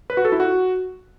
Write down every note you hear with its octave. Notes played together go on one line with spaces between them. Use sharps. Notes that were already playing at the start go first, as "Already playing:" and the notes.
B4
F#4
A4
E4
F#4